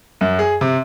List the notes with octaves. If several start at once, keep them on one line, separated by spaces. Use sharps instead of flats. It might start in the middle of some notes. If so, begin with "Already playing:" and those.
F#2
G#4
C3